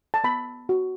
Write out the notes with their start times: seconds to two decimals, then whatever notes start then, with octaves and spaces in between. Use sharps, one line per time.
0.14 A5
0.24 B3 B5
0.69 F#4